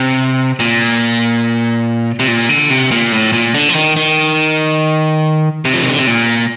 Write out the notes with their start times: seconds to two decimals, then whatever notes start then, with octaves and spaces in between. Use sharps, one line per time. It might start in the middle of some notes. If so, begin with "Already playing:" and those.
Already playing: C3
0.60 A#2
2.19 C3
2.28 A#2
2.49 D3
2.70 C3
2.91 A#2
3.12 A2
3.33 A#2
3.54 D3
3.69 F3
3.75 D#3
3.97 D#3
5.65 C3
5.74 F3
5.82 D#3
5.90 D3
5.99 C3
6.07 A#2